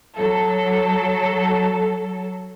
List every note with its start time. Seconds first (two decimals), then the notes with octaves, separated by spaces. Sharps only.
0.16 F#3 A4